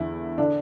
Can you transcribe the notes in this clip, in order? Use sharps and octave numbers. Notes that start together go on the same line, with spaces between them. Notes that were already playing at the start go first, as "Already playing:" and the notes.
Already playing: E2 D3 E4
D3 D4